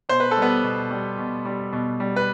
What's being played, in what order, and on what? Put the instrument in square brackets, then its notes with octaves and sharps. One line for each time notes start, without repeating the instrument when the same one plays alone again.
[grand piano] B2 C5
B4
A4
G3
B3 B4
B2
G3
B2
G3
B2
G3
B4